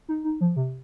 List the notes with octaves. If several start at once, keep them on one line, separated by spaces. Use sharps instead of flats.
D#4
D#4
F3
C3